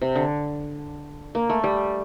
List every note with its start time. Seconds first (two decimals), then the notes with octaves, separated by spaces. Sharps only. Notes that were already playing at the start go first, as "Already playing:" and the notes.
0.02 C3
0.15 D3
1.35 A#3
1.49 A3
1.64 G3